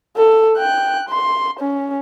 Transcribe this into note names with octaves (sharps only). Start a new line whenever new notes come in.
A4
G5 F#6
C6
C#4